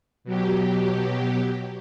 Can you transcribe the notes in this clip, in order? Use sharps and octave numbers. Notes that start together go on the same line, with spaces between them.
B2 F#3 G4